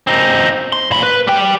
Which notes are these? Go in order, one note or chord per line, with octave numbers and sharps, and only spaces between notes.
C4 D#4
C6
A#2 B5
B4
G3 G5